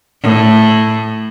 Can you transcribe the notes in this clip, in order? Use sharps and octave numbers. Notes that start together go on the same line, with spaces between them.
A2